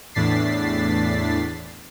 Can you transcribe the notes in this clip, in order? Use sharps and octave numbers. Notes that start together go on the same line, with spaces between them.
E2 A2 D4 A6 B6 C7